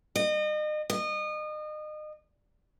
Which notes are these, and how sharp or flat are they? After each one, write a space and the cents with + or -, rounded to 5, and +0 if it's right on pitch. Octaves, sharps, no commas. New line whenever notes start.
D#5 -35
D#5 -30